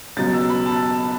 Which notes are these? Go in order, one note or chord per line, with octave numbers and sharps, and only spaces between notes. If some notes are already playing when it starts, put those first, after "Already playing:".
C#2 B2 F#3 A6
E6
B5
A5